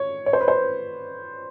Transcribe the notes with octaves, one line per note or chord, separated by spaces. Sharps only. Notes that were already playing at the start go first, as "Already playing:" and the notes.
Already playing: C#5
C#5
C5
B4
C5